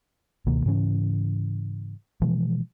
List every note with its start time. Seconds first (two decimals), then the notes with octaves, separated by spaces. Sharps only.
0.46 C#2 B2 D#3 A#3
0.66 G#2 C#3 E3 C#4
2.22 B2 E3 F3 G#3